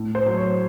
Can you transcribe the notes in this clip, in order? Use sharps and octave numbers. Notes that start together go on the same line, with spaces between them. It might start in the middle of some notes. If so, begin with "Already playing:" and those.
Already playing: A2
C5
F#3
C#5